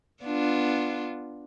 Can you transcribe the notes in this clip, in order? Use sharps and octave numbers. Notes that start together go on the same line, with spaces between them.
B3 D4 F4